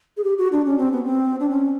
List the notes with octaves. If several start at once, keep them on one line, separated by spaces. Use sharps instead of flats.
G#4
G4
F#4
D4
C#4
C4
B3
C4
D4
C#4